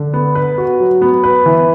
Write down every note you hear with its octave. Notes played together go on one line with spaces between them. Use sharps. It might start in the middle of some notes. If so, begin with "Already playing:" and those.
Already playing: D3
B3
B4
F#4
F#3
B3
B4
E3